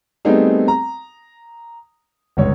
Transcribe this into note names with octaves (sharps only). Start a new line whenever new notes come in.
G3 A3 B3 C4 D#4 G#4
A#5
G1 C#2 C#5